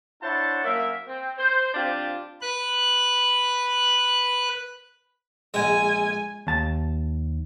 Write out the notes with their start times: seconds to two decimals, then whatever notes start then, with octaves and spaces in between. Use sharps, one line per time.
0.22 D4 E4 C5 C#5 F#5 A5
0.64 F#2 A#3 E5
1.06 C4
1.37 C5
1.74 F3 C4 D4 F4 G4
2.41 B4 F#6
5.54 A#1 G#3 G#5
6.47 D#2 A5